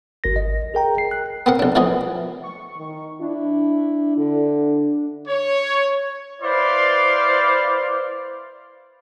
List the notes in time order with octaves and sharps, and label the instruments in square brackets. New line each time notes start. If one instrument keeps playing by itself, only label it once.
[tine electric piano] G#1 A#4 A#6
D#5
G#4 A#4 G5 A#5
C7
F#6
[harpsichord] B3 C4 A#4 F#5
B1 D4
E3 F3 G#3 B3 G#4
[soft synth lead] C#6
[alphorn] D#3
[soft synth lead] D4 [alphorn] E4
[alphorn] D3
[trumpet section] C#5
E4 B4 C5 D5 F5 C6